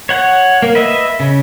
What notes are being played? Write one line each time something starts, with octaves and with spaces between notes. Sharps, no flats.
C#5 F#5
A#3
B4 D#5 E5
C#3